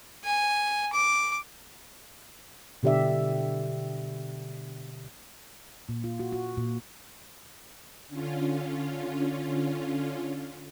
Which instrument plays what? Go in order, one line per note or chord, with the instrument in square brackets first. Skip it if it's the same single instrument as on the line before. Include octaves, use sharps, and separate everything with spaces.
[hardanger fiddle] G#5
D6
[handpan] B2 D3 G4 D5 E5
A#2
F4
F#4
F#4
A#2
[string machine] D3 C#4 F4